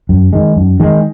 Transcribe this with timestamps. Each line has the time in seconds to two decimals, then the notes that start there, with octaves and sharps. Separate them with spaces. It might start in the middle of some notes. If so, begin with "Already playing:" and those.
0.09 F#2
0.33 D#3 G#3
0.56 F#2
0.80 D#3 G#3